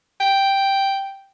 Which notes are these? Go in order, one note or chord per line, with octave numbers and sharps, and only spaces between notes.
G5